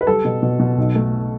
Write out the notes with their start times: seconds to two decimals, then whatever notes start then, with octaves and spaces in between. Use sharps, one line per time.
0.01 B4
0.07 G3 A4
0.25 B2
0.42 B2
0.59 B2
0.78 B1
0.95 A3